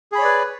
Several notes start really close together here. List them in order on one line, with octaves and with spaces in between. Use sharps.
G#4 B5 C#5 D5 B4